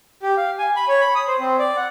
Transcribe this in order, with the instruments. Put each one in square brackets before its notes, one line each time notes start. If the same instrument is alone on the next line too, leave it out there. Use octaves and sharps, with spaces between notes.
[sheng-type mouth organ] G4
F5
G#5
B5
C#5
B5
D#6
C5
C4
D5
F#5